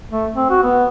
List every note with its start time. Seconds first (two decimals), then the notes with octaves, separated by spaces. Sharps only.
0.11 A3
0.36 C4
0.50 F#4
0.63 B3